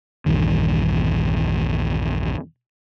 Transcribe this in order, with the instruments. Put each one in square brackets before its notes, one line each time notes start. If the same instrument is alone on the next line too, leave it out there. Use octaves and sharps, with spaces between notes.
[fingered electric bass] A#1 E2 G2 D#3